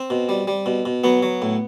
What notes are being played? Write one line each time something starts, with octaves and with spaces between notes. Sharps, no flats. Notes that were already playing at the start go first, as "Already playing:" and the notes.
Already playing: C4
B2
G3
G3
B2
B2
F#3 B3
F#3
A2